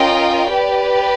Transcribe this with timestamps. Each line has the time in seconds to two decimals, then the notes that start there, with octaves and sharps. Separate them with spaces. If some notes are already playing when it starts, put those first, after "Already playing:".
Already playing: C#4 F4 A#4 D#5 G5
0.51 G4 B4 D5